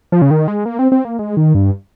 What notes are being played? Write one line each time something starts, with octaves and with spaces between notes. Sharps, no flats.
F3
C#3
D#3
G#3
A#3
C4
C4
A#3
G#3
D#3
G2